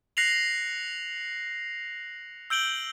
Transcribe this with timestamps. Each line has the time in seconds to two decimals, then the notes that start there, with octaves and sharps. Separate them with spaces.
0.17 F#6 A#6 C7 C#7 F7 F#7
2.50 E6 G6 D7 F#7 G7